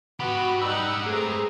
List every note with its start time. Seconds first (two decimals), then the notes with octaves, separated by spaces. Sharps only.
0.20 B3 F#4 G4 B4 B5
0.61 G3 D#4 F#5 E6
1.06 A3 C4 G#4 A#5